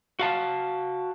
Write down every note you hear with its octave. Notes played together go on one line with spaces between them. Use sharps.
F#4 F5 A5